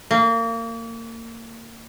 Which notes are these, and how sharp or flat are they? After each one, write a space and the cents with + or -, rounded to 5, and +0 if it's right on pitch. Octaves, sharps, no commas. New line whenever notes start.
A#3 -30